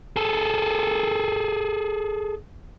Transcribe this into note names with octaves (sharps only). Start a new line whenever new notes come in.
G#4 A4